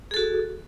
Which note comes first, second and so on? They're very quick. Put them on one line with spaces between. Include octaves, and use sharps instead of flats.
G#4 A4 F#4